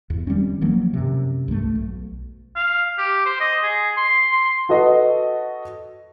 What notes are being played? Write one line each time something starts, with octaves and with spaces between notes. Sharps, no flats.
E2
D#3 G3 C4 C#4
D#3 F3 F#3 A#3
F#2 C3
C2 G2 G3 A3
B1
F5
G4
C5
D#5
G#4
C6
C6
F#4 A4 B4 D#5